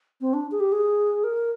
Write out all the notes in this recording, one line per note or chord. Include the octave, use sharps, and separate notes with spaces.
C4
D4
G#4
G4
G#4
A#4